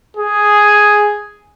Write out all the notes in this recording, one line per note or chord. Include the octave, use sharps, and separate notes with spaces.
G#4